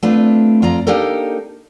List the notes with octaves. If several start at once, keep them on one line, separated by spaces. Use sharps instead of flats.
A3 C4 D4 F4 B4
F2 F4 D5 A#5
A#3 D4 D#4 G4 A4 A#4